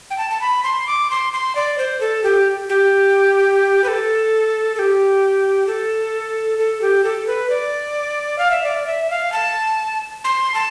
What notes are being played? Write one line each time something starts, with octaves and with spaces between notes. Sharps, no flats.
G5
A5
A5
B5
C6
D6
C6
C6
D5
C5
A4
G4
G4
B4
A4
A4
G4
A4
A4
G4
A4
B4
D5
F5
E5
D5
E5
F5
A5
C6
A5